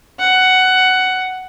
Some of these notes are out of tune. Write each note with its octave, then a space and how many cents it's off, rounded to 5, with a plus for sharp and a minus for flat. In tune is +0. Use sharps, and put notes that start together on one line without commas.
F#5 +10